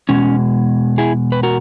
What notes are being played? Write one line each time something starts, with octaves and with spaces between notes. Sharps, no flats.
E2 B2 G#3 C#4
E4 G#4
B4
F#4 A#4